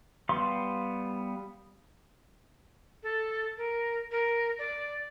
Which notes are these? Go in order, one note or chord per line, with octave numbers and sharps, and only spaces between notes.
G3 B3 F5 C6
A4
A#4
A#4
D5